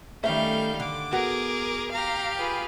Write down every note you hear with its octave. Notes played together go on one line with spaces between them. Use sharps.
D#3 G3 A3 C#4 E5 F5 G6
D3 D6
B3 F#4 G#4 A#4
G4 F5 A#5
F4 G#4 B4